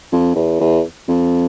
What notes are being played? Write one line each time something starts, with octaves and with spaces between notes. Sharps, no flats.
F2
E2
E2
F2